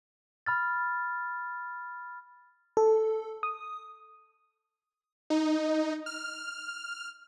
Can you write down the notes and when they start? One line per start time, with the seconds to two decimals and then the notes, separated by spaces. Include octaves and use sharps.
0.46 B5 F6 A6
2.77 A4
3.43 D#6
5.30 D#4
6.06 F6